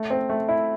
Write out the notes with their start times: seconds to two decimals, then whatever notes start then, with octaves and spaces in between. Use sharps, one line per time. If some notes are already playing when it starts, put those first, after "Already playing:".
Already playing: A3
0.10 C4
0.30 A3
0.49 E4